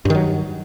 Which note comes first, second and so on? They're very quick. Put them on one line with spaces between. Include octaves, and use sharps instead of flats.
G2 D#3 F#3